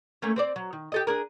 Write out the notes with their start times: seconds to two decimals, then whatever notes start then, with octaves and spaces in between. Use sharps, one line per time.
0.22 A3 A#3 C#4
0.36 C4 C5 D5
0.56 F#3
0.73 D#3
0.92 G4 A4 D#5
1.07 D4 G#4 A#4